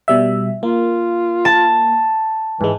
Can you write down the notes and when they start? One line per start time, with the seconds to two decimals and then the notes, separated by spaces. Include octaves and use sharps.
0.08 B2 G3 E5
0.63 A#3 F4
1.45 A5
2.61 G#2 E3 G#3